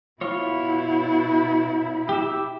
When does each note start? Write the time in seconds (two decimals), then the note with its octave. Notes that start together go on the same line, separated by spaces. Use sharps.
0.21 B2 E4 F4 C#5
2.09 G4 E5